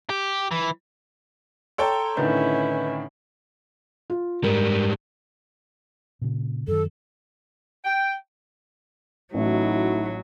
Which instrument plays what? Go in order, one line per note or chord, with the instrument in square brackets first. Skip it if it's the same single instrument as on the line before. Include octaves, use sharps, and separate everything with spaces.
[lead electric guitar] G4
E3
[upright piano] A4 C#5 G5 [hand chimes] A#5 C6
[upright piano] A2 D3 D#3 [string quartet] C#4 E4 [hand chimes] B4 D#5 G6
[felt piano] F4
[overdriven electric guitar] G#2 G3 [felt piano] A#4
[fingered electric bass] A#2 C#3
[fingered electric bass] F#2 D#3 [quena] A4
[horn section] G5
[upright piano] A1 [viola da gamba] F#3 [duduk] A3 [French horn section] D#4 E4 F#4